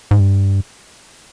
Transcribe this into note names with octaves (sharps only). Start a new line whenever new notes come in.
G#2
G2